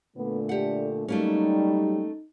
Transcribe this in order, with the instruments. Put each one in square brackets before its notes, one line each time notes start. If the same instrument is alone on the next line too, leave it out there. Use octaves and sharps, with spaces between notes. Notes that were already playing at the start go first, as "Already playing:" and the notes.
[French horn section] A#2 D3 A3 [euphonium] B3
[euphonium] D4 [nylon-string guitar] G4 F#5
[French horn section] F#3 G3 [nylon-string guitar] A3 A#3 C#4 [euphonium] D#4